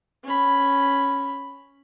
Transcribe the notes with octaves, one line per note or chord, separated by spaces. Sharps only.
C#4 B5